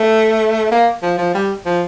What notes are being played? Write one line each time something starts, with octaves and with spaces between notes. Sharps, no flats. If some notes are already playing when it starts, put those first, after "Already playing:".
Already playing: A3
A#3
F3
F3
G3
F3